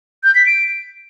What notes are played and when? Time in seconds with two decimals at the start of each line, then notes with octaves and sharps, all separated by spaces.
0.24 G6
0.35 B6
0.47 D7